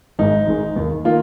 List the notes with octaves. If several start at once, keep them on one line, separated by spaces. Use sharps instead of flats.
G#1 G#2 D#3 G#3 D#4
G#1 G#2 D#3 G#3
D#2 D#3 A#3
D#3 A#3 F4